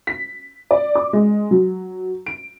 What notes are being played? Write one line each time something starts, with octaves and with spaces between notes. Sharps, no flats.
B6
D5
D6
G#3
F#3
D7